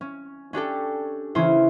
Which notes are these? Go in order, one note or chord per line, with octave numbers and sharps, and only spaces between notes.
C#4
C#4 D4 G4 A4
C#3 E3 C#4 E4 C5